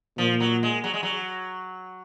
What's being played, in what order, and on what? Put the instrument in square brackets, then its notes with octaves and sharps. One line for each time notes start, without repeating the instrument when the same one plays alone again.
[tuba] A#2 [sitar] F3
[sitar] F#3
G#3
F#3
G#3
F#3